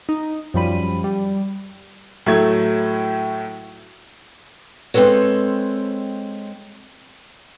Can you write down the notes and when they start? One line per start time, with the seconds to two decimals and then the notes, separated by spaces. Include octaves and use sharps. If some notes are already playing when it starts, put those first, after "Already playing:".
0.09 D#4
0.54 F#2 F3 G3 B5 D#7
1.04 G3
2.26 A2 F#3 A3 G#6
4.94 G#3 C4 F4 A4 B4 C#5